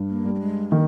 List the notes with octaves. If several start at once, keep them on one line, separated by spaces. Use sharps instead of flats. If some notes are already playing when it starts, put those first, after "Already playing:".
Already playing: G2
A#3
G3
A#3
G#3
D#3 A#3